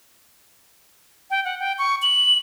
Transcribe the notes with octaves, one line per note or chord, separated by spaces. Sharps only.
G5
F#5
G5
C#6
F#7